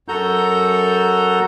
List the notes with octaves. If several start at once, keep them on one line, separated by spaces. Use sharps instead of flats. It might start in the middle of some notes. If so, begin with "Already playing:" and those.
F#2 F#4 A4 A#5 G6